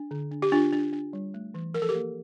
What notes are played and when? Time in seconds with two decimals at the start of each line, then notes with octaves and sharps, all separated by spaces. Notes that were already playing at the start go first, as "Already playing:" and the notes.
Already playing: D4
0.11 D3
0.31 D4
0.42 G4
0.52 D4 F4
0.73 D4
0.93 D4
1.13 G3
1.34 A3
1.54 E3
1.74 F3 A#4
1.82 A4
1.89 G4 A#4
1.95 A#3